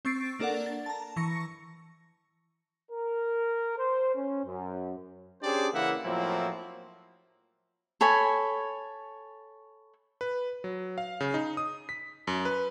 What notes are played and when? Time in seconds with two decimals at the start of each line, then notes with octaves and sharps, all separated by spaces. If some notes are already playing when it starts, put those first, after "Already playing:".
0.05 C4 C#6 E6 A6 C7 D7
0.39 A#3 D4 A4 A#4 D5 F#5
0.66 A6
0.86 A5 A#5
1.16 E3 C#6 A#6 C#7
2.92 A#4
3.78 C5
4.15 C#4
4.46 F#2
5.42 C#4 D4 G4 G#4 C5 D5
5.74 C#3 E3 A#3 E4 E5 F#5
6.05 A2 F3 F#3 A#3 C4 E4
8.01 A4 C#5 G#5 B5
10.21 B4
10.64 F#3
10.98 F5
11.20 C#3
11.34 D#4
11.57 D#6
11.89 B6
12.27 F#2
12.45 B4